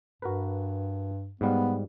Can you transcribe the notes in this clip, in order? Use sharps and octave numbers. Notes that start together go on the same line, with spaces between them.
G2 F#4 A#4 B4
G#2 G3 B3 F5